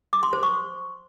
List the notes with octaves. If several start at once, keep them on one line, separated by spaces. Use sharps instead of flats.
D6
C6
C5
C#6